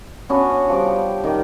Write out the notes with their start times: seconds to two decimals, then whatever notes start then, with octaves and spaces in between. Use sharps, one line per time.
0.29 B3 C#4 D4 F#4
0.50 F#5
0.68 F3 G3 D5 D6
0.86 G5
1.24 D#3 A#4 D5 G5